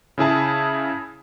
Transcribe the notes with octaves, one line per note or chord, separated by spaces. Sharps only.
C#3 E4 G#4 A5